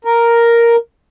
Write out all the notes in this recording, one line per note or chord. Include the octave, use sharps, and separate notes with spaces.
A#4